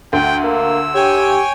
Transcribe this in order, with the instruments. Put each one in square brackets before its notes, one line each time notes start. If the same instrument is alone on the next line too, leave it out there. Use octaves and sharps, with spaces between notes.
[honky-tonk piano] D2 [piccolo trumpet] G5
[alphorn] A#3 [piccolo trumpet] E6
[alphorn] G4 [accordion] C#5 G5 G#5